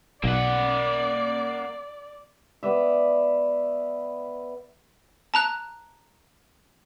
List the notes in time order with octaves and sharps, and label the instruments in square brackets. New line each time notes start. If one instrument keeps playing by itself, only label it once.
[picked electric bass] B1 [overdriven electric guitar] A#3 F#5 [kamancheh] D5
[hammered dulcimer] B3 B4 D5 E5
[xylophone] A5 A#5 F#6